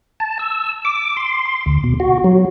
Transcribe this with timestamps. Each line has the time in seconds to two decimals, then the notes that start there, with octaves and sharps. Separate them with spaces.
0.20 A5
0.39 E6
0.85 D6
1.17 C6
1.45 C6
1.66 D2
1.84 B2
2.00 F#4
2.24 F#3